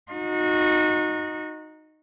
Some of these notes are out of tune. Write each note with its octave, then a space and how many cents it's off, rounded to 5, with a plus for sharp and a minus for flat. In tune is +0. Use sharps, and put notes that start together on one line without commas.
D#4 -5 F#4 -25